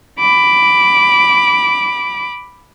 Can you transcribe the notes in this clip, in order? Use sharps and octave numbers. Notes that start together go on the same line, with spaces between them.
B5 D6